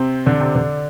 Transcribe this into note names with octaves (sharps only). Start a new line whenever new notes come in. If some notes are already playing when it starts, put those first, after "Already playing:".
Already playing: C3 C4
D3 D4
C3 C4
D3 D4